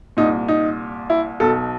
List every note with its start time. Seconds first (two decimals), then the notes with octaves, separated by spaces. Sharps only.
0.17 C2 A#2 D#4
0.48 D#4
1.10 E4
1.40 B1 B2 A4